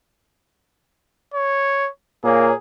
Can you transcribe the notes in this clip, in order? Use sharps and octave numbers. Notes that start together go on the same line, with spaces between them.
C#5
A#2 A#3 G#4 C#5